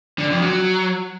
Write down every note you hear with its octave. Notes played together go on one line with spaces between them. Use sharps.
D3
F2
F#3